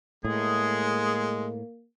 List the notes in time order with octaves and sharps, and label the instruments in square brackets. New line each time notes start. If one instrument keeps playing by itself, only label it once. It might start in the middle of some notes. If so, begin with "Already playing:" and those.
[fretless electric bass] A2 [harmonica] G#3 [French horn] A#3 [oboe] G#4